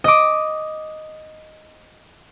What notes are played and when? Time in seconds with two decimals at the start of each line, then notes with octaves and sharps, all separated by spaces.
0.04 D#5 D6